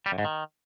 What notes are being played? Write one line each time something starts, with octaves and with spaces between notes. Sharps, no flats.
G3
F#2
G#2
D#3